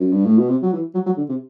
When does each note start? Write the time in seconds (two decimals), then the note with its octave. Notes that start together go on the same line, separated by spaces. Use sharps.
0.00 F#2
0.12 G2
0.25 A2
0.38 B2
0.49 C3
0.63 F#3
0.73 E3
0.95 F#3
1.06 F#3
1.17 D3
1.29 C3